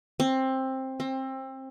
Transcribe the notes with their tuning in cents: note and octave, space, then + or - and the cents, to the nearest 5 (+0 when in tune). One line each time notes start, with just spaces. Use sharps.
C4 +15
C4 +25